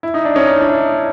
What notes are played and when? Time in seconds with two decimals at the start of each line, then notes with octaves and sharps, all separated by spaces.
0.03 E4
0.14 D#4
0.25 D4
0.35 C#4 D#4
0.48 D#4
0.60 D4 E4